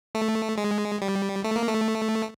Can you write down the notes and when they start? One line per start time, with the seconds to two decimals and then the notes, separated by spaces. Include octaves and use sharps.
0.15 A3
0.58 G#3
1.02 G3
1.44 A3
1.56 A#3
1.68 A3